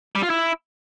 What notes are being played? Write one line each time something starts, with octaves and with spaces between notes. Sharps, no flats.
G3
F4
E4